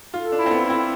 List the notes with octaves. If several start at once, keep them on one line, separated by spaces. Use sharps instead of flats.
F4 A4
D4
E4
C4
B3
E4
C4